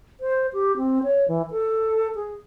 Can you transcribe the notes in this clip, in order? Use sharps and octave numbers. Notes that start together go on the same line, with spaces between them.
C5
G4
C4
C#5
E3
A4
G#4